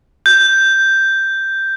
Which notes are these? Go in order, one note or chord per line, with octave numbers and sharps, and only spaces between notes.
G6